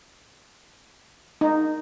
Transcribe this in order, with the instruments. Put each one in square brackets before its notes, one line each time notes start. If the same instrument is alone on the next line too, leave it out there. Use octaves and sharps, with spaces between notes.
[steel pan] D#4